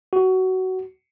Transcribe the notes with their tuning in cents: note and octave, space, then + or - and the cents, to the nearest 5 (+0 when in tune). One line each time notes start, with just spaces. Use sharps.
F#4 +15